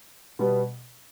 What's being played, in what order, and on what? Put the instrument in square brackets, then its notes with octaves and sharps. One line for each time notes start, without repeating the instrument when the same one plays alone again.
[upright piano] B2 G3 B3